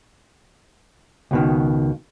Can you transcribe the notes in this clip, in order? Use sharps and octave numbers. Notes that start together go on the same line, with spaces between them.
C#2 B2 D#3